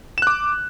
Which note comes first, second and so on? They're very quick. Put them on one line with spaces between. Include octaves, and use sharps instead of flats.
E7 F#6 D6